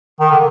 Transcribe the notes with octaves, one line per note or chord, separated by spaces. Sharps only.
D#3
D3